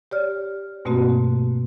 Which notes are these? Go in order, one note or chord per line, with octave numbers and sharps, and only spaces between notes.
G4 C#5 D5 F6
G2 B2 A3 A#3 C4 F#4